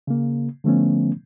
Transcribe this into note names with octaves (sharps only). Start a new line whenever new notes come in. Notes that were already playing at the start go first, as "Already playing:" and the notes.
C#3 A#3
D3 F3 A3 B3 C#4